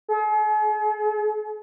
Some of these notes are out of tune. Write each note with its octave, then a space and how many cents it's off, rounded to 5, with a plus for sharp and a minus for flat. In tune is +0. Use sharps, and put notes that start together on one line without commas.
G#4 +45